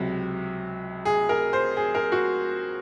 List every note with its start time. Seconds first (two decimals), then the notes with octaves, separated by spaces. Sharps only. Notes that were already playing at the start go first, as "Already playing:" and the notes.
Already playing: C#2 C3 F#3
1.05 G#4
1.29 A#4
1.53 C5
1.77 G#4
1.95 A#4
2.12 F#4